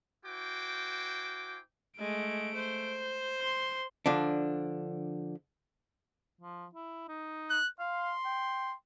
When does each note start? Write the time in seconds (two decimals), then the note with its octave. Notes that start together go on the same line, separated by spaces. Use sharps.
0.24 E4 F#4 C5 G5 G#5 D6
1.99 G#3 A3 D7
2.55 C5
3.42 C6
4.06 D3 F3 D4
6.41 F3
6.75 E4
7.08 D#4
7.50 F#6
7.79 F5 C6
8.25 G5